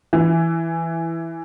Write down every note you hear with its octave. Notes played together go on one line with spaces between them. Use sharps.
E3